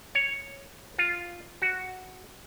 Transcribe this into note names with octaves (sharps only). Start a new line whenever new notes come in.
C#5
F4
F#4